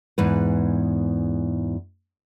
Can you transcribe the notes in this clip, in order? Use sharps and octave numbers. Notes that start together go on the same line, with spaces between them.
E2 G#2 B4